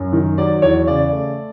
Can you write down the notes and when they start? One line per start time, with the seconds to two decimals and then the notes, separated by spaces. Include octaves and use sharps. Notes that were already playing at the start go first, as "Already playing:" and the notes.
Already playing: F#2
0.13 D#3
0.38 F#3 D5
0.62 E2 C#5
0.87 C#3 D5
1.12 A3